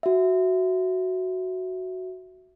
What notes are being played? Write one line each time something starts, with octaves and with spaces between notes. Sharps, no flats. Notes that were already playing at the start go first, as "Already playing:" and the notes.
F#4 E5